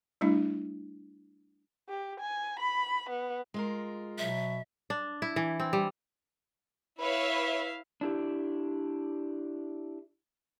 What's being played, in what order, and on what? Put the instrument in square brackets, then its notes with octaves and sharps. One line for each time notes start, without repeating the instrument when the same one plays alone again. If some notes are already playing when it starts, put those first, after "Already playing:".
[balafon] G3 A3 D4 E4
[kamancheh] G4
G#5
B5
B3
[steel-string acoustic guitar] G#3 F4 A#4
[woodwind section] B2 F#3 [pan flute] E5
[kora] D4
E4
E3
C4
G3
[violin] E4 F5 [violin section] B4 C#5 E5
[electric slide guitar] D4 E4 G4